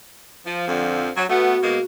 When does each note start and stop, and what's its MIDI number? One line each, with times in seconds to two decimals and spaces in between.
0.45 0.67 53
0.68 1.09 41
0.68 1.09 50
0.68 1.09 53
1.16 1.25 54
1.29 1.56 57
1.29 1.56 59
1.29 1.84 66
1.63 1.78 47
1.63 1.78 56
1.63 1.78 58